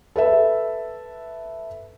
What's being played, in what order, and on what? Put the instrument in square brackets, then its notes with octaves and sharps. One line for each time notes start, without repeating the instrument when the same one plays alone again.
[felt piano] A4 B4 E5